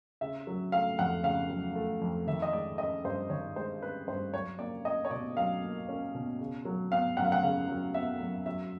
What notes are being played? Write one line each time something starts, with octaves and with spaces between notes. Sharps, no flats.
C#3 E5
F#3
A3 F5
F2 F#5
C#3 F5
F#3
A3
F2
D#3 E5
D#5
G#3 D5
C#4 D#5
G2 C5
D#3 C#5
G#3 C5
C#4 B4
G2 C5
F#3 C#5
A#3 D5
C#4 D#5
C#5
B2 D5
F#3 F5
A#3
C#4
B2
C#3
F#3
B3 F5
F#2 F#5
F5
F#5
C#3 F5
F#3
B3 E5
F#2
F#3 E5